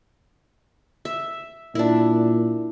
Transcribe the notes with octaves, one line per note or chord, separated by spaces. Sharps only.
E5
A#2 D4 E4